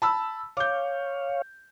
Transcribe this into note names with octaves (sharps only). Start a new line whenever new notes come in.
A5 B5 E6
C#5 F5 D6 G6